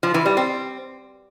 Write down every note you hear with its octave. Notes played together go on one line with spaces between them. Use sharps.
F3
E3
G3
C4